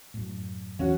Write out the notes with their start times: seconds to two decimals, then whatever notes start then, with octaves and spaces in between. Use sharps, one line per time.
0.14 F#2 A2
0.79 E2 E3 F#3 C#4 F#4